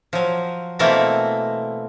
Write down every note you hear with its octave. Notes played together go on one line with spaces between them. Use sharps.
F3 F#3
B2 E3 A3 A#3 C4